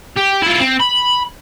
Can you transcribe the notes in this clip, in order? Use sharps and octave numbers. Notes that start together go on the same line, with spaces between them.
G4
E4 F4
C4
B5